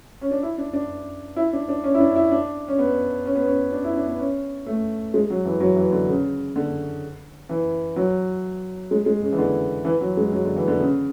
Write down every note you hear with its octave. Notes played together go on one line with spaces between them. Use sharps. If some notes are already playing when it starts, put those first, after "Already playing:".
C#4
D4
E4
D4
D4
E4
D4
D4
C#4
E4
D4
E4
D4
C#4
B3
C#4
B3
C#4
D4
E4
D4
B3
C#4
A3
G#3
F#3
E3
F#3
E3
D3
C#3
D3
E3
F#3
G#3
G#3
C#3
E3
D3
E3
F#3
G#3
F#3
D3
E3
D3
C#3